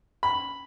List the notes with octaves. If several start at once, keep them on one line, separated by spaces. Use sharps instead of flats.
B5